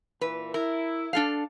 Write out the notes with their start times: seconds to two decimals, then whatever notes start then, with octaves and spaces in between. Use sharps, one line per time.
0.21 A#2 E3 B4
0.54 E4 A#4
1.13 D4 A4 F5